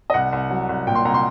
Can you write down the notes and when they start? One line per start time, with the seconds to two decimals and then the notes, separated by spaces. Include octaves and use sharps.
0.10 D#5
0.14 C2 F#5
0.33 C2
0.50 F#3
0.69 C2
0.87 A#2 G5
0.95 C6
1.05 C2 A#5
1.14 C6